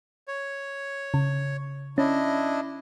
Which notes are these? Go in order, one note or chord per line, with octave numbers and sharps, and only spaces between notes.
C#5
C#3
C#4 D4 E4 D#5